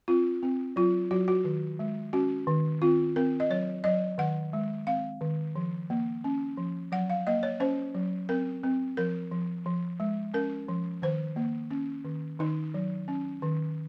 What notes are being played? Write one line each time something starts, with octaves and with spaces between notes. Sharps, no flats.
C4 F4
C4
F#3 F4
F#3 F#4
F#4
D#3
G#3
C#4 F#4
D#3
C4 F4
C4 A#4
D#5
F#3 C#5
F#3 D#5
D#3 F#5
G#3
C4 F5
D#3
F3
A#3
C#4
F3
F#3 F#5
F5
A#3 D#5
C#5
C#4 C5
F#3
C4 A#4
C4
F3 A#4
F3
F3
G#3
C#4 A#4
F3
D#3 C5
A#3
C#4
D#3
D#3 D#4
F#3
C#4
D#3